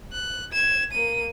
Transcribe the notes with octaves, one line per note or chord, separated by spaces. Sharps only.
F#6
G#6 E7
A#3 D#7